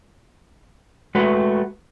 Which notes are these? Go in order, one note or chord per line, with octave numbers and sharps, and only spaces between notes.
G#3 A3 F#4 B4